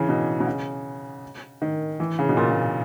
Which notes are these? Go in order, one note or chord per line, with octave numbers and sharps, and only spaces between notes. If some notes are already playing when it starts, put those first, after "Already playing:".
Already playing: C#3 E3
B2
B2
C#3
D#3
E3
C#3
B2
A#2
A#2